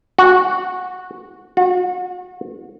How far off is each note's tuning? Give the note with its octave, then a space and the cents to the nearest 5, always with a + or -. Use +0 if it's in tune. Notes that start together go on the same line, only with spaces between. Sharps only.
F#4 -10
F#4 -35